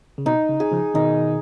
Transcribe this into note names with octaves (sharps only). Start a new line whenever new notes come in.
C#3
B2 D#4
C#3
G#4
C#3 F3
B2 D#3 D#4